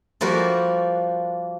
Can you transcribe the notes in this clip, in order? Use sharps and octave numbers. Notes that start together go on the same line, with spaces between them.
F3 G3 A#3 F#4